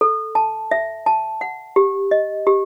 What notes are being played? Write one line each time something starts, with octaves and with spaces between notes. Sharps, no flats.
A4
A5
E5
A5
F#5
G4
D#5
G4